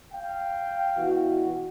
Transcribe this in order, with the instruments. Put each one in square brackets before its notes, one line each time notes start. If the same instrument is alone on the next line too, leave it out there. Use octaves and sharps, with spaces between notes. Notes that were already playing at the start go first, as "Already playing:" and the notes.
[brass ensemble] F5 G5
[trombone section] B2 E3 F#4